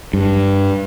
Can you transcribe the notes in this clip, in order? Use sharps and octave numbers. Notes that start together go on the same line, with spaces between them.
G2